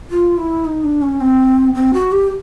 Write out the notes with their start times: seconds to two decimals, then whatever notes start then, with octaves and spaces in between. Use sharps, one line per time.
0.11 F4
0.38 E4
0.65 D#4
0.84 D4
1.02 C#4
1.20 C4
1.75 C4
1.93 F#4
2.12 G4